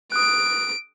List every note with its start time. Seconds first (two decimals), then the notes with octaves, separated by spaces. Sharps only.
0.12 D#6 F#6 D7